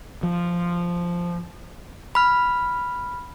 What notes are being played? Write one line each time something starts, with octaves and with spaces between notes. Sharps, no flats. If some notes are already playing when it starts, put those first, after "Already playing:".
F3
B5 F6